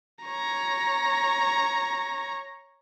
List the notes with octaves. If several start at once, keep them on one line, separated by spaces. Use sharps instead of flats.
C#5 A#5